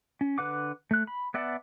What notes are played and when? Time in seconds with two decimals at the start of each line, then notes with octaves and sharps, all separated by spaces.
0.21 C#4
0.38 D3 B4 F#5 D6
0.91 A3 F#6
1.07 B5
1.34 B3 D5 E5 F#5 A5